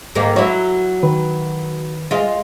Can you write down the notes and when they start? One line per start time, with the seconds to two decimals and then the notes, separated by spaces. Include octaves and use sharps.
0.15 G#2 D#3 A#3
0.36 F#3 E4 C#5
1.03 D#3 B4
2.11 G#3 F4